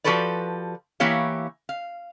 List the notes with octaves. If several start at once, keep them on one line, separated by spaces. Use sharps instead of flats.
F3 F#4 G4 A4 B4 D5
E3 A#3 E4 G4 C#5 F5
F5